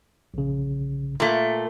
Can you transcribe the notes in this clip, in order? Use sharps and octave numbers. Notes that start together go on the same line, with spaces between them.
A#1 C#3
A#2 A3